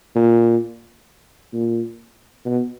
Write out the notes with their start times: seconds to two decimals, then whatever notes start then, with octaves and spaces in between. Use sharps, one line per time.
0.16 A#2
1.53 A#2
2.45 B2